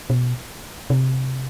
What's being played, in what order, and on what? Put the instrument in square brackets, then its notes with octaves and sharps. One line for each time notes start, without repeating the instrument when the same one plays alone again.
[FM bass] B2
C3